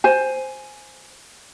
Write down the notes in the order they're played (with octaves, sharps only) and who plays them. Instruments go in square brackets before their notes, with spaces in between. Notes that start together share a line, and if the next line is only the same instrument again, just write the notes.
[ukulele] C5 G#5